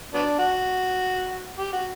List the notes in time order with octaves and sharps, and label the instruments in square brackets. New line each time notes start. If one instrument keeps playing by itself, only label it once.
[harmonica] F#3 B3 D4
F#4
G4
F#4